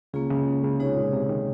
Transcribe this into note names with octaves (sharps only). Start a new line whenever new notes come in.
C#2 C#3 A#3 C#4 F4 G#4
C#2 C#3
C#2 C#3
C3 G#3 D#4 G#4 C#5
A#2
C3
D#3